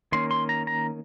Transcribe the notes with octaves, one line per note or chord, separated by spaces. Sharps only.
D#3 A#3 C#4 C6
C6
A#5
A#5